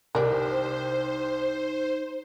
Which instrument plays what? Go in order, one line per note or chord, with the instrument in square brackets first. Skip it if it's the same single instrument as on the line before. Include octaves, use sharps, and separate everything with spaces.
[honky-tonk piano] C2 G4 [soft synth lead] D#4 [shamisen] A#4 D5 [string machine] C5